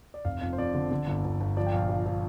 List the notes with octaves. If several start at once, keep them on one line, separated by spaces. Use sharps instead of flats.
D5
F1 F5
F2 F5
C5
F2 D5
D3
D3
G1
G1
G1
F3 D5
G5
A#1 F5
F3
F3